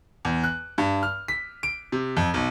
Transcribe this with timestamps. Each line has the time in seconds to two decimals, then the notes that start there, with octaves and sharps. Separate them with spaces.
0.25 E2
0.44 F#6
0.78 G2
1.03 F6
1.28 B6
1.63 D7
1.92 C3
2.17 F2
2.34 B1